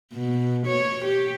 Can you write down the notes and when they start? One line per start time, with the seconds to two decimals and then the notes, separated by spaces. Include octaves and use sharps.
0.14 B2
0.66 C#5
1.05 G4